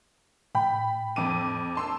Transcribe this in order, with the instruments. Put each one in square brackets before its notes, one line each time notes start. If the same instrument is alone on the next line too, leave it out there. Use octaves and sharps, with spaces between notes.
[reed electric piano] A2 G5 [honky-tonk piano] B5
[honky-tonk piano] F2 D6 D#7
A5 C6 E6